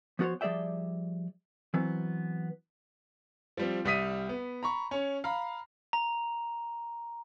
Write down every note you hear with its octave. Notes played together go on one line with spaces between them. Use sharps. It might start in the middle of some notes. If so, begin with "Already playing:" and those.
F3 B3 F#4 A#4 C5 C#5
F3 G3 G#4 D5 E5 G5
E3 F#3 B3 C4
F3 G3 C4
C2 G3 E5 D#6 B6 D#7
B3
A#5 B5 C#6
C#4 C#5
F5 A#5 B5
A#5